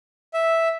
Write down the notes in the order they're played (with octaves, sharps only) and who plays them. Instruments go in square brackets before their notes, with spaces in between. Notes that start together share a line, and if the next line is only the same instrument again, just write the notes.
[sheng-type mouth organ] E5